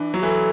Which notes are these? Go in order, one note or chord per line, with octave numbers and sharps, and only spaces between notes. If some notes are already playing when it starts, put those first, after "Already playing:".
Already playing: E3 D4
F#3
E3 A4